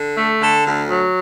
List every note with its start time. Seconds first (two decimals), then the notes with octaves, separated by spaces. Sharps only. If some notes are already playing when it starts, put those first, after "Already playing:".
Already playing: D3
0.17 A3
0.41 D3 A4
0.65 D2
0.90 F#3